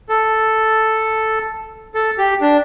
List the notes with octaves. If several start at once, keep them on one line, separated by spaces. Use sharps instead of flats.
A4
A4
G4
D4